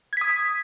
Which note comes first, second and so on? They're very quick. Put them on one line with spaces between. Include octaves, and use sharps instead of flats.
G#6 B6 D#6